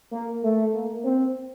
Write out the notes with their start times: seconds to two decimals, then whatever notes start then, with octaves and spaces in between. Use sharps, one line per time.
0.12 A#3
0.43 A3
0.74 A#3
1.04 C4